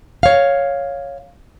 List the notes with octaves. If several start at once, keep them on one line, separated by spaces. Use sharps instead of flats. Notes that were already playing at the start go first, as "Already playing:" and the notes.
C#5 F5